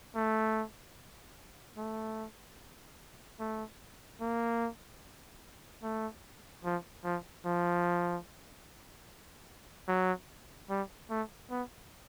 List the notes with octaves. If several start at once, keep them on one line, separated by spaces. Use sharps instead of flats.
A3
A3
A3
A#3
A3
F3
F3
F3
F#3
G3
A3
B3